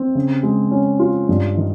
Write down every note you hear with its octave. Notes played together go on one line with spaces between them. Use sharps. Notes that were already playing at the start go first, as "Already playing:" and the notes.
Already playing: C4
C#3
G#3
C#4
F4
G2
D#3